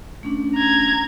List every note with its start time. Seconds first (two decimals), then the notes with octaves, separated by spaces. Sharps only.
0.23 A3 C#4 D4
0.56 A#5 G#6